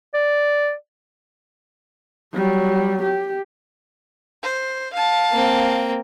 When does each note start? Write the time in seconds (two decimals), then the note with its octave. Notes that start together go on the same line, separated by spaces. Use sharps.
0.14 D5
2.33 F#3 G3
3.03 G4
4.43 C5
4.94 F5 A5
5.31 A#3 C4